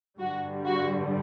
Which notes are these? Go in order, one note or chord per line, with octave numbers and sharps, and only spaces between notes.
G2 D3 G3 F#4
F#4